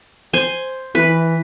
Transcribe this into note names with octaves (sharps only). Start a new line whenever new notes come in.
C5 G#5
E3 B4